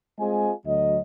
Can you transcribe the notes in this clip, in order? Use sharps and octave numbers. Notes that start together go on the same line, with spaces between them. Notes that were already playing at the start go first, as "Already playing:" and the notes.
G#3 C4 F4 G#4 D#5 G#5
D2 F#3 D#5